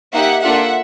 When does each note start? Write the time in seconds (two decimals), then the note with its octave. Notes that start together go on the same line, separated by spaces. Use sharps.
0.13 A#3 D#4 G4 E5 F#5
0.43 A#3 D4 F4 A4 E5 F#5